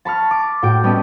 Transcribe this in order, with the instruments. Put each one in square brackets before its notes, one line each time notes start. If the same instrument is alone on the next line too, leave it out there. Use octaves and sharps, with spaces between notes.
[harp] A5 B5 C#6 F6
D6
A2 F#4 G5 G6 D7
G3 B3 C#4 A4 D5 D#5